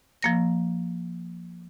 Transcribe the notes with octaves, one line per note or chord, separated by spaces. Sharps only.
F3 A#3 A#6